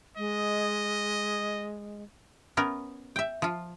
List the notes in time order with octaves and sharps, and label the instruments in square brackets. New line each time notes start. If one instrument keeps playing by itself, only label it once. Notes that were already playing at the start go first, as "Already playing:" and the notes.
[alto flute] G#3 [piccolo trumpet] D#5
[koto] B3 C#4 A#4
E5 G5
F3 F4